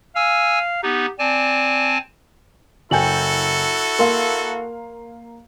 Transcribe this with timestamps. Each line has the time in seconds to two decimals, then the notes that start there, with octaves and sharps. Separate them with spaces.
0.16 F5 G#5 E6
0.83 B3 D#4 G4
1.19 C4 D5 G#5 A5
2.91 F#1 E4 F#4 A4 G5 G#5 G6 F#7
3.99 A#3 A#4 F5 C6